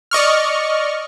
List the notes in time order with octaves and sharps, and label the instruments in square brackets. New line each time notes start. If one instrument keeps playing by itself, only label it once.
[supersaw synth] D5 D#5 C#6 F6